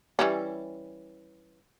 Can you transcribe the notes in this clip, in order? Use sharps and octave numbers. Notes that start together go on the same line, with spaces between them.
E3 G3 C#4